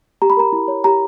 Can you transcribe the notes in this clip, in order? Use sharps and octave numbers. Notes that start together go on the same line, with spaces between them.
G4 A#5
B5
A#4 A#5
E4
C#5
G4 A#5